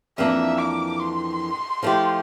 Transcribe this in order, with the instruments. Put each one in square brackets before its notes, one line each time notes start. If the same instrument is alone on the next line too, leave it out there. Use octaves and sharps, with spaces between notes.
[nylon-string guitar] F2 E3 A#3 D4 [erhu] E5
[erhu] D6
C6
[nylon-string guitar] F3 A3 E4 G4